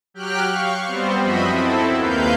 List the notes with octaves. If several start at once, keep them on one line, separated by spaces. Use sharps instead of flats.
F#3 G4 G5 F6 F#6
F5 C#6
G3 B3 C4 C5
F#2 F3 F#4 D#5 E5 B5
C4 E4 A4
D#2 A#3 B4 F5 G6